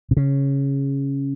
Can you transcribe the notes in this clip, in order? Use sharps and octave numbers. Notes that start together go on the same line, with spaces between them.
C3
C#3